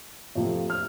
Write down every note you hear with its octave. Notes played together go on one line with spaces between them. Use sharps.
F2 C3 F3 A3
F6